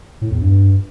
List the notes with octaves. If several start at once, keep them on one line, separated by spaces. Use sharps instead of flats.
A2
E2
G2